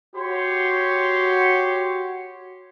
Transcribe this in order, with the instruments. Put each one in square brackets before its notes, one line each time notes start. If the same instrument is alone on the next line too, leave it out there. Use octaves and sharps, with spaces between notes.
[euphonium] F#4 [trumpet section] G4 C#5 C6